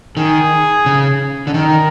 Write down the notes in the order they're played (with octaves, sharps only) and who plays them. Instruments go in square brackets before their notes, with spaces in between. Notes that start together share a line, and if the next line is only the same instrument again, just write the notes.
[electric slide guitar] D#3 [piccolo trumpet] G#4
[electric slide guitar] C#3
D3
[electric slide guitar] D#3 [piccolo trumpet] A#4